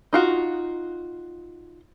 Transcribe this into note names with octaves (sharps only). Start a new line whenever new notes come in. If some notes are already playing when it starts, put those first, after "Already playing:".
D#4 F4 F#4